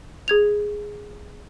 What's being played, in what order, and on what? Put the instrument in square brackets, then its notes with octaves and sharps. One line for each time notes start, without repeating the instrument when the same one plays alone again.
[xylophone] G#4 G#6 F7